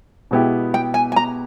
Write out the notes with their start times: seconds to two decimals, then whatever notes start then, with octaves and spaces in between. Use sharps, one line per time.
0.31 B2 G#3 B3 E4 G4
0.74 G5
0.94 G#5
1.12 G#5
1.16 A#5